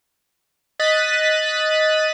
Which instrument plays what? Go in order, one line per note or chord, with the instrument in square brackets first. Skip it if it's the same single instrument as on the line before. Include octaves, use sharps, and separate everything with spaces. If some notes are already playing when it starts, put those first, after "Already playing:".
[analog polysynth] D#5 F#6 A6 B6 D#7